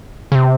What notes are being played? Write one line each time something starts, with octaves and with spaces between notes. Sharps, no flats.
C#3
C3